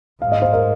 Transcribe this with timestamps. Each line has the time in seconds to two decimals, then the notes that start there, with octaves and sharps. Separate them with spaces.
0.22 G#2 F5
0.32 D#5
0.42 C5 F5
0.53 A#4 D#5